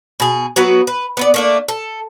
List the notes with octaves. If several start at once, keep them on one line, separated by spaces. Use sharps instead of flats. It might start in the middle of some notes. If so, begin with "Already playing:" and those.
B2 G#4
F#3 B3 F#4 B4
B4
B3 B4 D5
A3 A#3 D4
A4